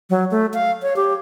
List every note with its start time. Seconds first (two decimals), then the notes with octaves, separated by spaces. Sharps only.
0.10 F#3
0.31 A3
0.53 F5
0.82 C#5
0.96 G4